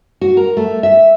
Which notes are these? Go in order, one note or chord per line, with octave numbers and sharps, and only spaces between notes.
F#4
A#4
A3
E5